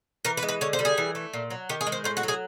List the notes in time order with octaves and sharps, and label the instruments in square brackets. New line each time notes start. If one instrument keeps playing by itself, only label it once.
[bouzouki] E3 A#4
B4
G#3
B4
D3 C#5
C5
G3
G#4
E3
A3
A#2
F#3
D#3 G4
G#4
G#3
C5
A2 C5
F#4
F#3
G#4